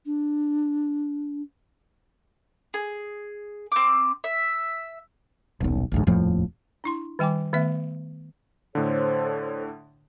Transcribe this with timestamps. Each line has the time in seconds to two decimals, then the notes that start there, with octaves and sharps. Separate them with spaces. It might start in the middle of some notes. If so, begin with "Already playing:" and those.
0.06 D4
2.74 G#4
3.72 C4 D6
4.24 E5
5.60 D#1 B1
5.92 A1 D2 G#2
6.07 D#1 F2 A2 F3
6.84 D4 E4 C6
7.19 D#3 G3 G5 G#5 D6
7.53 D#3 A3 B3 E5
8.75 A2 D3 A4 C5 C#5